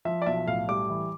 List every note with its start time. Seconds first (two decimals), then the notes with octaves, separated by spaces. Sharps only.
0.05 F3 E5
0.22 D5
0.26 B1 E5
0.47 A2 F5
0.68 G3 D6
0.89 E3